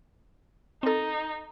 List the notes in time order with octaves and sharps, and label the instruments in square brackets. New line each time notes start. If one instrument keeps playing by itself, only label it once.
[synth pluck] C4 A4 [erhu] D#4